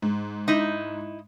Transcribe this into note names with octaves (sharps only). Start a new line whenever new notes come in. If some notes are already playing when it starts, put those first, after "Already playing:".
G#2
D#4 E4